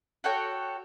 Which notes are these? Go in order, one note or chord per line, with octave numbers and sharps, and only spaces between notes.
F#4 A4 C#5 G5